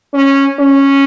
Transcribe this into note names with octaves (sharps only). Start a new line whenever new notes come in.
C#4
C#4